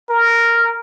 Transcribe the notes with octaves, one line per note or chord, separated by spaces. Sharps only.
A#4